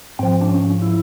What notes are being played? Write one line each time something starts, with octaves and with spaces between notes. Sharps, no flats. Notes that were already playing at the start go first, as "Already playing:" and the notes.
G#2 F3 C4
D4
C#4
E4